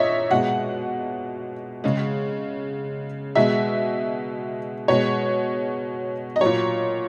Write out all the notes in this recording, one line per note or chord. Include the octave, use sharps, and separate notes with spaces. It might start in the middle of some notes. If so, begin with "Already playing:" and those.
Already playing: A#2 C#5 D#5 E5
B2 G#3 F#5
C#3 G#3
B2 G#3 E5
B2 G#3 C#5
D#5
A#2 F#3 C#5